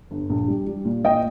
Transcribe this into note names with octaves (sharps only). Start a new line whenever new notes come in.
G1
A#1
G3
G3
A#2
A#2 D#5 G5